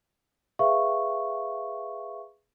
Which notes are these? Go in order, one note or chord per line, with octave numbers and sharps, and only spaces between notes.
G#4 B4 E5 F5 C#6